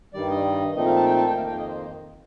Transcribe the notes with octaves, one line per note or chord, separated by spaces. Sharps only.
G2 D#3 G3 D5
D#5
A#2 F3 A3 C4 D#4 D#5
F5
A5
G5
A5
G5
F2 D#3 A#3 F5
G5
D#5
C5